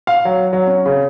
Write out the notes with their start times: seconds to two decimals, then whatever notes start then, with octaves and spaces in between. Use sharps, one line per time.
0.07 F5
0.25 F#3
0.53 F#3
0.67 C#4
0.86 C#3